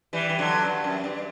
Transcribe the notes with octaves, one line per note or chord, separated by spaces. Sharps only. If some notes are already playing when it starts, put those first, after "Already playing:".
E3 G3
E3
D3 F#3
G2
F#2
G2